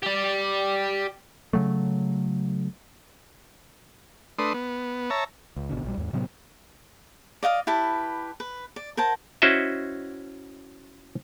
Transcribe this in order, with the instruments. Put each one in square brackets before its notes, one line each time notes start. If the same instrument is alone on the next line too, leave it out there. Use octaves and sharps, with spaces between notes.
[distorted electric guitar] G4 D5
[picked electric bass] C#3 F#3 A3
[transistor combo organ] A3 D4 B4 C6 D#6
B3
C#5 E5 A5 A#5
[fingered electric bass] C#2
G#1 B2 D3
A#1 G3
D#2 G#2
A2 C3 F#3 B3
[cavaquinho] D5 D#5 F5 D#6
E4 G4 B4 A5
B4
D5
A#4 C5 F#5 A5
[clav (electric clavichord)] C#4 E4 F#4 C5 D#5 E5